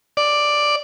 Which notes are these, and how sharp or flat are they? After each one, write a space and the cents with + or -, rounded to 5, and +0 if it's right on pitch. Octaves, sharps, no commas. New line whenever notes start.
D5 +5